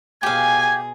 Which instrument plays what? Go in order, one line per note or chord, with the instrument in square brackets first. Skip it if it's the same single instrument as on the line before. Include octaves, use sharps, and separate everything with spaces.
[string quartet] B2 G#4 [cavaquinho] G4 F5 [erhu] G#5 [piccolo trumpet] G#6